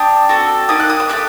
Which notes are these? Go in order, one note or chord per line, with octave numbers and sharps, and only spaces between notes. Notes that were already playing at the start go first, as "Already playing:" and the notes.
Already playing: D4 G4 D#6
C4 F#4 A4
A#3 D#4 G4 D#6
F#6
D#6
D#6
A3 C4 G4 F#6